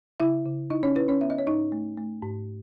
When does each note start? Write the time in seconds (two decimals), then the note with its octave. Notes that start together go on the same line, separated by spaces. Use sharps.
0.20 C#3 E4 E5
0.45 C#3
0.70 D#4 E4 D#5
0.83 C#4 C#5
0.95 E4 B4
1.08 C#4 C#5
1.21 B3 E5
1.30 D#5
1.38 C#5
1.46 G#2 D#4 D#5
1.72 A3
1.97 A3
2.23 G#2